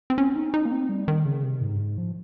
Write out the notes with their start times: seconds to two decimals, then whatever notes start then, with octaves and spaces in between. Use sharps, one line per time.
0.10 C4
0.18 C#4
0.36 D#4
0.54 D#4
0.65 A#3
0.72 C4
0.89 G3
1.08 D#3
1.25 C#3
1.43 C3
1.62 G#2
1.75 G2
1.79 G#2
1.98 F3